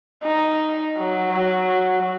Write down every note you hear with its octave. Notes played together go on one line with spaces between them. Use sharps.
D#4
F#3